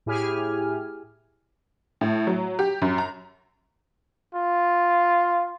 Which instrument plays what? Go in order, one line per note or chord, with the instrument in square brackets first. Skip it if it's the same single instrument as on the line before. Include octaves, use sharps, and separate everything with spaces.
[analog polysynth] A2 E4 G4 G#4 G#5 F6
[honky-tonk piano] A2
F#3
G4
F#2
A#5
[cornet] F4